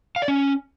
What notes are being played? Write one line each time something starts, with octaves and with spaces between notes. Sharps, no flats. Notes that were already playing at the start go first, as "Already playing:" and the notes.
F5
D5
C#4